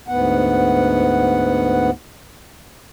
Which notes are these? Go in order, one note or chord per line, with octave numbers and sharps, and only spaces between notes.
D2 G#2 B3 F#5